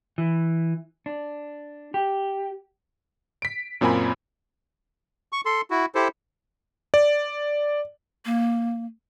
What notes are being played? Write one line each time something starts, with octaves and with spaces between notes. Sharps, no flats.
E3
D4
G4
B6 D7
F#2 A#2 C4 A#4 G#5 B5
C#6
A4 C6
E4 F#4
E4 G4 A4 C5
D5
A#3